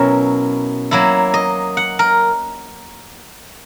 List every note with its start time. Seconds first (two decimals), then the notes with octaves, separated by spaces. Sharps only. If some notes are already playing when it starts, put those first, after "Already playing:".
Already playing: B2 F#3 C#4 E4 A#4
0.91 F#3 A#3 E4
1.34 D#5
1.77 F#5
1.99 A#4